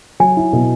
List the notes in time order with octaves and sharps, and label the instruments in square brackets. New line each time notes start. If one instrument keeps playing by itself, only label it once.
[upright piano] F#3 [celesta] G#5
[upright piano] E4
B2